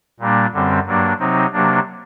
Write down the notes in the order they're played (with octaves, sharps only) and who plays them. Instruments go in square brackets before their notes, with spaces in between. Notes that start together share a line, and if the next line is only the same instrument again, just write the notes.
[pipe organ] A#2 G3 A#3 D4
F#2 D3 G3 C4
G2 F#3 A#3 D4
C3 F#3 C4 D#4
C3 F#3 A#3 D4